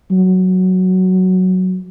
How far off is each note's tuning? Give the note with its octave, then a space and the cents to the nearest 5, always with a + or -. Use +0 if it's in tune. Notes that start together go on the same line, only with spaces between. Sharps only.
F#3 +0